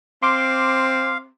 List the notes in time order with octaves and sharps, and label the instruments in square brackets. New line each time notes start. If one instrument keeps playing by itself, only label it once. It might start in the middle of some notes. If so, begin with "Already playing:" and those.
[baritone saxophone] C4 [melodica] F5 [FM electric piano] C6 D6